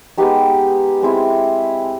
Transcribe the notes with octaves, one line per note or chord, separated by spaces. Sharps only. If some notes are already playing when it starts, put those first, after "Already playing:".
G#3 B3 D#4 G4
G#3 C4 E4